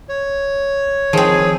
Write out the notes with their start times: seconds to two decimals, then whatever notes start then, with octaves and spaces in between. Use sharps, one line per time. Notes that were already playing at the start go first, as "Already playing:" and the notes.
0.09 C#5
1.13 D#3 F3 C4 G#4